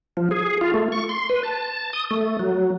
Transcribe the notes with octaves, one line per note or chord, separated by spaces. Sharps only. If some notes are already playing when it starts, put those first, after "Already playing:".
F3
G#4
F4
A3
C#6
C6
B4
A5
D#6
A3
F#3